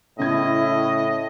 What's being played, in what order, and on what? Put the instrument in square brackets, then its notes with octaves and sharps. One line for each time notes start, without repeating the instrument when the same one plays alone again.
[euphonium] A2 [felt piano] C#3 G#6 [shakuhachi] E4 [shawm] D#5